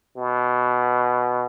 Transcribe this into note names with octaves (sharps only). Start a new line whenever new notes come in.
B2